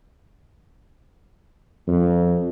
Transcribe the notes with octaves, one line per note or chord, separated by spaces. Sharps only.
F2